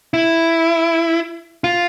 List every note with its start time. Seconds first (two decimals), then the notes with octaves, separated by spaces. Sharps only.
0.14 E4
1.64 F4